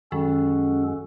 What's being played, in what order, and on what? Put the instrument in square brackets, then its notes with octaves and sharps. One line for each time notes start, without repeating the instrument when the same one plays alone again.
[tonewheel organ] F#2 G#3 F#4 [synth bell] D#3 [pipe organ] C#4 A4